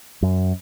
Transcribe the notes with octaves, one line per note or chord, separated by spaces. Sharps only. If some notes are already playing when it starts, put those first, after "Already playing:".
F#2